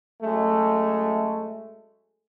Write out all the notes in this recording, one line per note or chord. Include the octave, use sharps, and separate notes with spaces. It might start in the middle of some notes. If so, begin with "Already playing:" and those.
F#2 G#3 A3